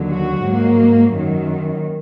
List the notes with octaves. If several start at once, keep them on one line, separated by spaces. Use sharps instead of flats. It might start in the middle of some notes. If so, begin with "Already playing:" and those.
Already playing: D#2 D3 F#3
F#4
G#2 F#3 A#3
F#2 D#3 F#3